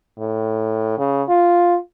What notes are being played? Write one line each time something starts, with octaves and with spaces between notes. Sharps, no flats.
A2
C#3
F4